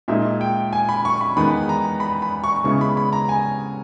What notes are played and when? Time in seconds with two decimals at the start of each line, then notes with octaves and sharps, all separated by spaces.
0.08 A#2 G#3 D#4 E5
0.41 G5
0.73 G#5
0.89 B5
1.05 C#6
1.21 B5
1.36 E2 D#3 G#3 B3 D#4 B5
1.69 A#5
2.00 B5
2.22 B5
2.44 C#6
2.64 C#3 G#3 B3 E4 C#6
2.81 B5
2.97 B5
3.13 A#5
3.29 G#5